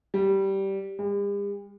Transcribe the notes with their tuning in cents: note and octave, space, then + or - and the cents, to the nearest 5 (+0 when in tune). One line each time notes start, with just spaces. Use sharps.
G3 -15
G3 +45